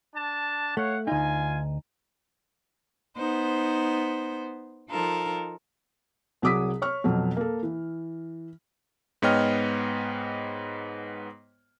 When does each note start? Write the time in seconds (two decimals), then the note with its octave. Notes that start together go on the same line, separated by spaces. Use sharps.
0.15 D4 A5
0.77 A3 C#5 F5 F#5
1.07 D2 D#4 F4 G#5
3.17 B3 D#4 C5
4.89 F3 D#4 F4 A4 A#4
6.42 C2 F#3 G#4 D6 D#6 B6
6.82 C#5 C#6 F6
7.04 F2 B2 F#3
7.37 A#3 A4
7.63 E3
9.22 G#2 B3 C#5 D#5 G5 F6